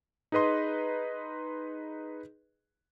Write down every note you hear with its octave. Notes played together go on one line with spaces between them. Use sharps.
D#4 G#4 B4 D#5 C6